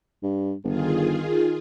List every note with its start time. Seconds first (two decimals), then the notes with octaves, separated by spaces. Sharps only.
0.23 G2
0.64 G1 D#3 F4 G#4